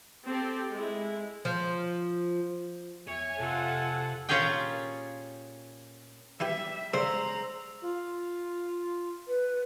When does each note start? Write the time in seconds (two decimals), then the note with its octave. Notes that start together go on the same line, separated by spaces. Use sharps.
0.24 C4 G4 A4
0.70 G#3 E4
1.45 F3
3.08 E2 C#5 E5 G#5
3.40 F2 C3 F4 A4 F#5
4.29 A#2 C#4 F4 G4 G#4 G5
6.40 E3 G3 E4 G4 E5
6.94 G2 C#3 G#3 C5 A#5 E6
7.81 F4
9.28 B4